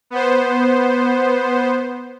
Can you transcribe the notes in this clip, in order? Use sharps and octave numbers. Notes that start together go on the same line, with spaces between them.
B3 C5